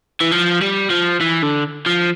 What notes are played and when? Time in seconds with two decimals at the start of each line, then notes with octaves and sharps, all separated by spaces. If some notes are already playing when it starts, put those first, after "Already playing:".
0.21 E3
0.32 F3
0.62 G3
0.91 F3
1.21 E3
1.43 D3
1.86 F3